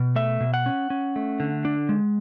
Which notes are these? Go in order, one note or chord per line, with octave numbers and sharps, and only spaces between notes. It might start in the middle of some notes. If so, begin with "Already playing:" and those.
Already playing: B2
A3 E5
B2
F#5
C#4
C#4
A3
D3
D4
G#3